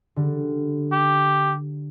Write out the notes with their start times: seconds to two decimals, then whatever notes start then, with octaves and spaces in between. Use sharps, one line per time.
0.16 D3 G3
0.93 G4